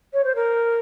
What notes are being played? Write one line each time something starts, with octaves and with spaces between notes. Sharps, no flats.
C#5
C5
A#4